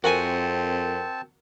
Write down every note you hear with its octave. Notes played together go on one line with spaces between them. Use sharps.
F2 C4 F#4 A#4 F#5 G#5 A5